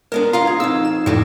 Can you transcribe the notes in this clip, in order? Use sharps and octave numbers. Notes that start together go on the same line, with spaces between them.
G#3 B3 D4 A#4
E2 F4 F5 A#5 C7
G#4 D#6 G#6
F2 C#3 C4 D#4 E6
E7
F2 A2 G3 A3 F#4